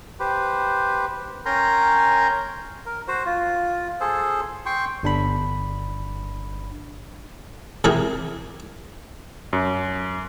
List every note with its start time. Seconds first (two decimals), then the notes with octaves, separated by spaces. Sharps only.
0.20 G4 B4 C5
1.46 C#4 A#4 G5 G#5 A#5 C6
2.86 A#4
3.08 F#4 C5
3.26 F4
4.01 G#4 A4 C5
4.66 G5 C6 C#6
5.03 G1 D4 B5
7.84 C3 E3 G4 G#4 A#4
9.53 F#2